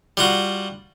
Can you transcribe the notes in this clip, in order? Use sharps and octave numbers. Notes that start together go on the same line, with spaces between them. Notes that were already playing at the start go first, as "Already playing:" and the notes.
G3 F4 F#4